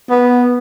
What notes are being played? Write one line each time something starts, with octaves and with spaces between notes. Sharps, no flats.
B3